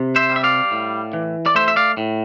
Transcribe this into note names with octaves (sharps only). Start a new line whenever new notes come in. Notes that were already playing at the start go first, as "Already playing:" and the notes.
Already playing: C3
C5 E5
G3
E5
D5 F5
A2
E3
D5
A3 C5 E5
E5
D5 F5
A2